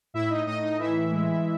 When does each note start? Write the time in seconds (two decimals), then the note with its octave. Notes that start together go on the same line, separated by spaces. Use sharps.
0.14 A2 E4 E5
0.30 D#4 D#5
0.46 A2 D#4 D#5
0.62 D#4 D#5
0.79 E3 E4 E5
1.11 G#3